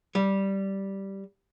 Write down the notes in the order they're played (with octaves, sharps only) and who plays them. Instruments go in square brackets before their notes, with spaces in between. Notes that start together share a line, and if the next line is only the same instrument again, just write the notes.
[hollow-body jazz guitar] G3